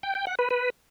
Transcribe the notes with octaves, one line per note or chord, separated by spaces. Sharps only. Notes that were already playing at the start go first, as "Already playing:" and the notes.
G5
G5
F#5
B4
B4